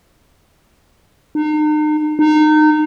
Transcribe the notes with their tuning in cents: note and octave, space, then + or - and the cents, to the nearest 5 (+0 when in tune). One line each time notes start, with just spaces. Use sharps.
D#4 -40
D#4 -25